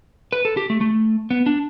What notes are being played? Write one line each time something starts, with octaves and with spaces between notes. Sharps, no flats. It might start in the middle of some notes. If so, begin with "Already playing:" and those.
B4
A4
G4
A3
A3
B3
D4